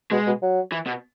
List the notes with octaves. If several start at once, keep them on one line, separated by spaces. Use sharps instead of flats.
B2 G#3
B2
F#3
E3
B2